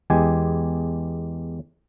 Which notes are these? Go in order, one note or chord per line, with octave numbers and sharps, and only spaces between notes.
E2 G#3 G4 G#5